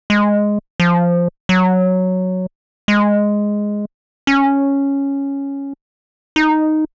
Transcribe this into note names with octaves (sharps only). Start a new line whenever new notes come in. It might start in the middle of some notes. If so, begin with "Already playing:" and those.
G#3
F3
F#3
G#3
C#4
D#4